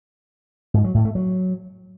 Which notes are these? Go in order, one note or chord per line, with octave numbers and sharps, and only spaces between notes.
G#2
F#3
A2
A3
F#3